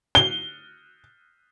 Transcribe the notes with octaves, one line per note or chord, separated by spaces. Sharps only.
G7